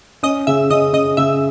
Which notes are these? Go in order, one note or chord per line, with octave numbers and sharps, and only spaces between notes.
C#4 D#5 D#6
C#3 E5 E6
C#3 D#5 D#6
C#3 D#5 D#6
C#3 E5 E6